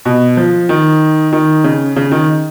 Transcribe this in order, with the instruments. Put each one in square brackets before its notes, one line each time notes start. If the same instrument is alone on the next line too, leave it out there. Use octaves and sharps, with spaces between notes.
[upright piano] B2
F3
D#3
D#3
C#3
C#3
D#3